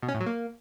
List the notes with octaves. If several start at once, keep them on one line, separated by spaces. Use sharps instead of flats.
B2
C#4
A2
F#3
A#3